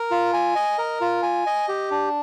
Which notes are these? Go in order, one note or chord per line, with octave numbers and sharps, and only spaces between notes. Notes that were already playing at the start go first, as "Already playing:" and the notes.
Already playing: A#4
F4
G#5
D#5
A#4
F4
G#5
D#5
G4
D4